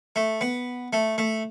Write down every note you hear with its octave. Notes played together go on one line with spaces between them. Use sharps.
A3
B3
A3
A3